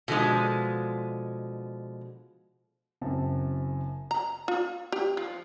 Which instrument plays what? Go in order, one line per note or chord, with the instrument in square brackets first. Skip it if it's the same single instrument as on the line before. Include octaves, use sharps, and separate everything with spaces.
[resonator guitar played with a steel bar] B2 D3 F3 G3 G#3
[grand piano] F#1 F#2 C4 A5
[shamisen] A#5
F4
G4
F3